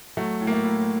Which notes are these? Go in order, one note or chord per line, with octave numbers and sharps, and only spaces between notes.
F#3 A3
A2
A#3
A3
A2